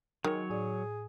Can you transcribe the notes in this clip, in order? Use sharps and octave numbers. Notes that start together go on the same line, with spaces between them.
D#3 F#3 G#3 C#5
A2 G#4 D5